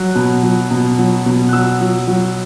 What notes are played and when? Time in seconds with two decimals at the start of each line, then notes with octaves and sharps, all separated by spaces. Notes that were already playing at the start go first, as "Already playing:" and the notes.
Already playing: F#3 F#6
0.15 B2
0.43 F#3
0.71 B2
0.99 F#3
1.26 B2
1.49 F#6
1.53 F#3 E6
1.81 F#3
2.08 F#3